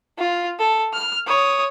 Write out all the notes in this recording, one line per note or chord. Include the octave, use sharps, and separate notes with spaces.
F4
A4
F6
C#5 D#6